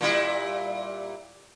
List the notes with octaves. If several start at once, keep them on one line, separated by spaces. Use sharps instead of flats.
A#2 G3 E4